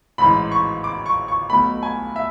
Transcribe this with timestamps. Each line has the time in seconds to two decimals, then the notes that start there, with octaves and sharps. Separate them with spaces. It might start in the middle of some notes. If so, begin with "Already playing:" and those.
0.18 A1 G#2 E3 B5
0.52 C#6
0.84 D6
1.06 C#6
1.28 C#6
1.50 B1 B2 A3 B5
1.83 G#5
2.16 E5